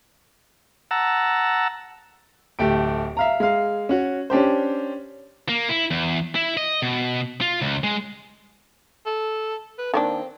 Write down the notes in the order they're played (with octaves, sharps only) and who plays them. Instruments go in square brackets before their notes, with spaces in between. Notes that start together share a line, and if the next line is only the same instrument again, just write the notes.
[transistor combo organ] F#5 A5 A#5 E6
[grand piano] D1 A3 G4 D7
E5 F5 A#5
G#3 F5
C#4 F#4
C#4 D4 G4 C5
[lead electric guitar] A#3
E4
E2
E4
D#5
B2
F4
C#2
G#3
[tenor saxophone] A4
B4
[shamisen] D#3 A#3 D4 [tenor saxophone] C4